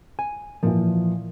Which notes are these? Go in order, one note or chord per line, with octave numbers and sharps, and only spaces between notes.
G#5
A#2 E3 F3